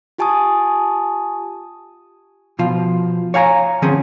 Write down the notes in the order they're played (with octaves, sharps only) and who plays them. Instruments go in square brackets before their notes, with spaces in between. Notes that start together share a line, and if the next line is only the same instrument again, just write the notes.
[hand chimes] F4 G4 G#5 A5 C#6 D#6
[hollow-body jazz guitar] B2 F3 F4
C#5 F5 G#5 A#5
D3 F3 C4 C#4 G#4